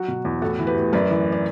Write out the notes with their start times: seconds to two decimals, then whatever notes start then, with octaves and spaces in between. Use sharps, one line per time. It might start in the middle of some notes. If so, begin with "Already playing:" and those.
Already playing: F#3 F#4
0.08 B2
0.25 E2
0.42 A2 F#4 A4
0.59 E3
0.67 G4 B4
0.76 A2
0.93 F#2 B4 D5
1.10 E3
1.32 D5